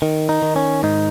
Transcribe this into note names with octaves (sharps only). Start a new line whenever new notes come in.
D#3
D#4
D#3
C#4
G#2 D#4